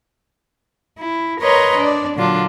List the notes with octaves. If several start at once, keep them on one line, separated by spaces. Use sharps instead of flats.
E4
A#4 B4 C#5 D#5 A#5 C6
D4 D5
A#2 D3 F#3 D4 F4